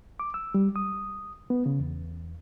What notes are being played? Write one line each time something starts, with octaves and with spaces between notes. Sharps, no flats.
D6
E6
G3
D#6
B3
C#3
E2